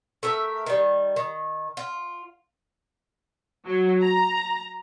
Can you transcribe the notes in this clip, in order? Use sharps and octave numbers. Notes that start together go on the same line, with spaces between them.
A3 A#4 E5
D#3 G3
D#3
F4
F#3
A#5